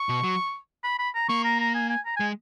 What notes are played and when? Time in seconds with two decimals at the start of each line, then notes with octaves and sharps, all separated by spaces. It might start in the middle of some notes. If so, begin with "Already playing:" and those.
Already playing: C#6
0.09 B2
0.24 F#3
0.84 B5
0.99 B5
1.15 A#5
1.29 A#3 C#6
1.44 A#5
1.60 A#5
1.74 G#5
1.90 G#5
2.05 A#5
2.16 G#3 G#5